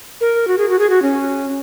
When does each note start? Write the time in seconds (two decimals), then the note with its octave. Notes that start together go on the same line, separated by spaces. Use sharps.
0.21 A#4
0.48 F#4
0.58 G#4
0.70 F#4
0.79 G#4
0.90 F#4
1.02 C#4